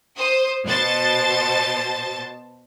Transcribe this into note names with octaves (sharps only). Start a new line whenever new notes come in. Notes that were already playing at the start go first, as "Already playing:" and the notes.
C5 D#6
B2 C5 A5 A6